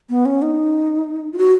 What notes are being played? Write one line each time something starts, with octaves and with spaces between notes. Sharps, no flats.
B3
C#4
D#4
F4
F#4